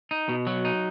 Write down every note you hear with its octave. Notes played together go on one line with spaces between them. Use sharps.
D#4
B2
F#3
D#4